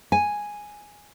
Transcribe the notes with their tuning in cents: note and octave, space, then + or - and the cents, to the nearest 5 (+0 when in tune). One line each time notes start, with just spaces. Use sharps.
G#5 +0